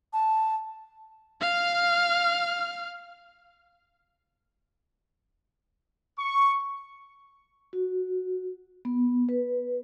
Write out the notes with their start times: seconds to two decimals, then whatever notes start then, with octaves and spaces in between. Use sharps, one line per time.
0.13 A5
1.41 F5 F6
6.18 C#6
7.73 F#4
8.85 B3
9.29 B4